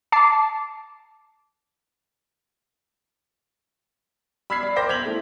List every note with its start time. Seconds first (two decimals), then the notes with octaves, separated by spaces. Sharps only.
0.12 A5 D6 C7
4.50 B5 E6 F6 G#6 B6 C7
4.63 D5
4.76 A#4 C5 G5 D6 G6 A#6
4.89 G6 G#6 B6 F7 F#7
5.06 A3 E4